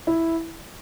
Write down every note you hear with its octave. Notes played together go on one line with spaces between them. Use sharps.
E4